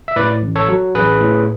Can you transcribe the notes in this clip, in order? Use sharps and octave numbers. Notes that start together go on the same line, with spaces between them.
E5
A2 B4 D5
A1
A4 C#5
F#3
A1 G#4 B4
A2